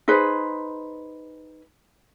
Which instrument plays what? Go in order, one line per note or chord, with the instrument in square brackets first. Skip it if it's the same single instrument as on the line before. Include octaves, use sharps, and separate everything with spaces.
[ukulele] D#4 G#4 B4 C5